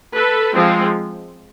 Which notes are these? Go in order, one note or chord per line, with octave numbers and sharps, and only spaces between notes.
A4 B4
F3 G#3 C4